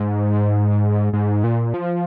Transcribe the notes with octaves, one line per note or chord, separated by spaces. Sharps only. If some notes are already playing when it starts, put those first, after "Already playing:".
Already playing: G#2
G#2
A#2
F3